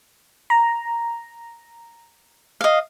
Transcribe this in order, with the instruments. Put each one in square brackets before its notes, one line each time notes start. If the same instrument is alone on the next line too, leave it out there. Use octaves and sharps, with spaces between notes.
[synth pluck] A#5
[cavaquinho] D#5 F5